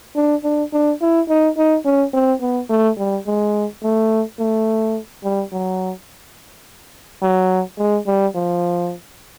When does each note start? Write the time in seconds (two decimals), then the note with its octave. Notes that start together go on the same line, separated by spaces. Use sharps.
0.16 D4
0.44 D4
0.73 D4
1.01 E4
1.29 D#4
1.58 D#4
1.85 C#4
2.14 C4
2.42 B3
2.70 A3
2.98 G3
3.26 G#3
3.83 A3
4.40 A3
5.24 G3
5.52 F#3
7.22 F#3
7.79 G#3
8.07 G3
8.35 F3